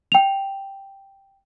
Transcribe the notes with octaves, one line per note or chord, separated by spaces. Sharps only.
G5 F7